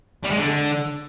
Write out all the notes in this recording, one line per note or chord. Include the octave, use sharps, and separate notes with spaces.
G3
G#3
D3